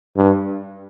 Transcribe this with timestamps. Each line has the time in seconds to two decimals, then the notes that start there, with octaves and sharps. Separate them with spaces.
0.17 G2